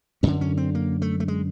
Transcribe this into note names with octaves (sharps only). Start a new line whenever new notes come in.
F#2 D3 C#4
C#4
C4
A#3
A3
A3
G#3